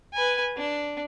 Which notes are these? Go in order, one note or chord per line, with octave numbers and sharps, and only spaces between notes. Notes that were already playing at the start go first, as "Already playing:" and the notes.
B4 G#5
D4